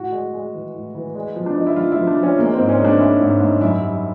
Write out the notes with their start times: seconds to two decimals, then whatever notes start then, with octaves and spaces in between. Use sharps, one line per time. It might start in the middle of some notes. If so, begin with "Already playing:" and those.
Already playing: A2 F#4
0.12 G#3
0.34 G#3
0.54 E3
0.74 A2
0.95 E3
1.15 G#3
1.36 F3
1.46 D4
1.56 F3 D#4
1.66 E4
1.76 F3 F4
1.92 E4
1.97 F3
2.07 D4
2.18 F3
2.23 C#4
2.38 G#3 A#3
2.53 C4
2.58 G#2
2.69 C#4
2.80 G#3 D4
2.99 G#3 E4
3.20 G#2
3.41 G#2
3.61 F#2 E4
3.81 G3